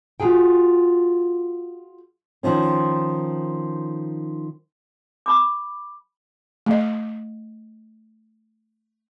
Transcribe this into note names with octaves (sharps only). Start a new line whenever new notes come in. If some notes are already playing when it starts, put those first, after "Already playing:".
F4 F#4 G#4 G5
D#3 F3 C#4
B5 D6
A3 D#5